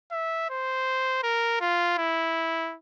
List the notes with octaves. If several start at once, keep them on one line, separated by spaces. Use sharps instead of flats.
E5
C5
A#4
F4
E4